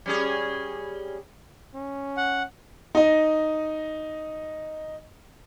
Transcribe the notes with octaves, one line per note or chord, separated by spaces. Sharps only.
G3 C#4 G#4
C#4
F#5
D#4 D#5